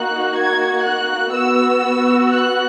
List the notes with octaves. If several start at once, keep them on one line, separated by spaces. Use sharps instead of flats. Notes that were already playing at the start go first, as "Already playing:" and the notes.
Already playing: A#3 D#4 F#4 F#6
G#6
F#6
B3 F#4 E6
F#6